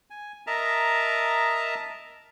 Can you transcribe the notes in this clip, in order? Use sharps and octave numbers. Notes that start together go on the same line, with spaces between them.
G#5
A#4 D#5 E5 A5 A#5